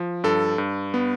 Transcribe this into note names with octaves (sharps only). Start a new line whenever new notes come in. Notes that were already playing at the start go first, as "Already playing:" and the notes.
Already playing: F3
G2 A4
G2
B3